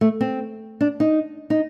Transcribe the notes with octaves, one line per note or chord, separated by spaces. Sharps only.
A3
C4
D4
D#4
D#4